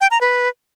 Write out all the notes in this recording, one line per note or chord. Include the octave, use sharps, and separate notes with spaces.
G5
A#5
B4